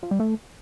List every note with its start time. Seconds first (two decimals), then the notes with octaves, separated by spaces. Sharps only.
0.03 F3
0.11 G3
0.20 A3